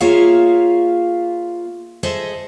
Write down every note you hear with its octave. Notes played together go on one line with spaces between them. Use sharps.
A#3 F4 G#4 C#5 E5 F5
G#4 A4 C5 D#5 E5